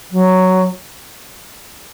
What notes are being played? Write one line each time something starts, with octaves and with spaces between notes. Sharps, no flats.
F#3